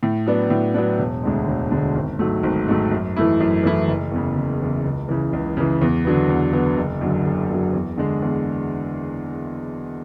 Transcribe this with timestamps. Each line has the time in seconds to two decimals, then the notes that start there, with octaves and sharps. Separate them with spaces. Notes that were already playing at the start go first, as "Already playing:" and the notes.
0.03 A2
0.27 F#3 B3 D4
0.50 A2
0.74 F#3 B3 D4
0.99 E1
1.23 D2 D3 G#3
1.48 E1
1.71 D2 D3 G#3
1.95 G#1
2.19 G#2 F#3 A3
2.43 G#1
2.68 G#2 F#3 A3
2.92 F#2
3.16 E3 A3 E4
3.40 F#2
3.63 E3 A3 E4
3.88 F#1
4.12 E2 C#3
4.36 F#1
4.60 E2 C#3
4.84 C#2
5.09 C#3 E3
5.33 C#2
5.57 C#3 E3
5.81 E2
6.05 D3 F#3 B3
6.29 E2
6.52 D3 F#3 B3
6.77 F#1
7.01 F#2 D3 F#3
7.25 F#1
7.50 F#2 D3 F#3
7.73 E2
7.98 D3 G#3
8.22 E2